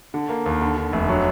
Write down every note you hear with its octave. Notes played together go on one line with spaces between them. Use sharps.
D3
A#3
D#2
D3
D3
F1
F#3